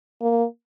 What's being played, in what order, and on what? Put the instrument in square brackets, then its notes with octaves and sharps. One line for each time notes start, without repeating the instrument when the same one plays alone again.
[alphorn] A#3